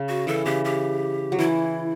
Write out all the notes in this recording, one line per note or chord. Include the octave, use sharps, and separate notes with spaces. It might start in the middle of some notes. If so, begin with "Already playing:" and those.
Already playing: C#3
F#4
E3 A4
C#3 G4
G4
F#3
E3 E4